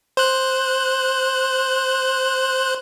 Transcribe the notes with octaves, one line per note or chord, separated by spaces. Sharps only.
C5 F#6